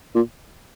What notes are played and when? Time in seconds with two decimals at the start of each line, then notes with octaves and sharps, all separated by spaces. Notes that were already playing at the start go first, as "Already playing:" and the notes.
0.15 A#2